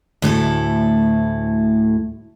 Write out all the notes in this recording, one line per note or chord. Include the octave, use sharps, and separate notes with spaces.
D2 A2 E4 A4